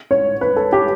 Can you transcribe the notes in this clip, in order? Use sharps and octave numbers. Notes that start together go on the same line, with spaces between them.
C#5
B4
A4
G4